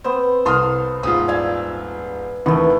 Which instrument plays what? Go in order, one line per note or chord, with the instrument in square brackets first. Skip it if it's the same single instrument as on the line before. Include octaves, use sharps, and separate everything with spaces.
[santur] B3 C4 [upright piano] C5
[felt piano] C2 C6 D#6 [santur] A4 F5
[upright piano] D#1 G#2 F4 [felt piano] D#6
[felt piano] D5 F5 [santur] G#5 E6
[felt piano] D#2 E3 [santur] A3 B3